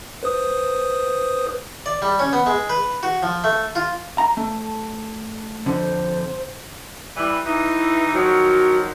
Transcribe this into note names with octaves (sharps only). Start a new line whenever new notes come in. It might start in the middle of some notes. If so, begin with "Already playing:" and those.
B4 C5 D#6
D5
G3
C#4
B3
G#3
B4
F#4
F3
A3
F4
A#5
A3
F2 D3 C5
E3 G3
E3 D#4
D#3 F3 F#3 F#4